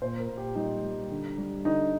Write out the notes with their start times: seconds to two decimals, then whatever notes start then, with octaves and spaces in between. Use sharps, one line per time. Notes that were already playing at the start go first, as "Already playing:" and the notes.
0.02 A#2 C5
0.20 A#4
0.29 A#2
0.38 G4
0.55 G3 D#4
0.83 G3
1.11 D3
1.38 G3
1.65 D3 D#4